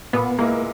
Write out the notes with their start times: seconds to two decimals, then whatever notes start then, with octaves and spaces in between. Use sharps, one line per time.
0.13 A#2 B3
0.38 G#3 A#3 B3 E4 A#4